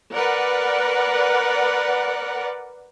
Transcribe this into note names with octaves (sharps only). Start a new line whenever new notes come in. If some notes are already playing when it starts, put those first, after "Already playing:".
A#4 B4 D5 F#5